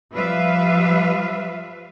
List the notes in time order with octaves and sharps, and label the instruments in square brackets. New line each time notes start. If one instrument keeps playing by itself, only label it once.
[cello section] F3 G3 B4 E5 F5